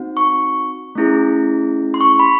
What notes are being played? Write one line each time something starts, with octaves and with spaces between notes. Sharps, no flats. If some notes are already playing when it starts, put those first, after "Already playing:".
Already playing: C4 D#4 F#4
C#6
A3 C#4 E4 G#4
C6
C#6
B5